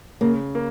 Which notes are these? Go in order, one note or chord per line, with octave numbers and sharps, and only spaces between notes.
C#3 A#3
A#3